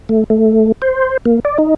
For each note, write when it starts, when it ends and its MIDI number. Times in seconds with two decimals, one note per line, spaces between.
0.09 0.24 57
0.30 0.72 57
0.82 1.17 72
1.25 1.40 58
1.45 1.58 74
1.58 1.74 63